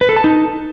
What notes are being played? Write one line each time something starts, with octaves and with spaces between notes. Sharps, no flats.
B4
A4
A5
D#4